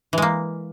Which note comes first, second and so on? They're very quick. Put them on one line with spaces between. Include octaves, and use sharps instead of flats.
E3 G#3 A#3